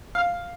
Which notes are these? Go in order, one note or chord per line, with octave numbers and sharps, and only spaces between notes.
F5